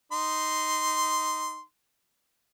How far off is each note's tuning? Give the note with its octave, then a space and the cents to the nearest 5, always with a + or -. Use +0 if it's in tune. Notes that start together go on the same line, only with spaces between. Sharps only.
D#4 +0 C6 -10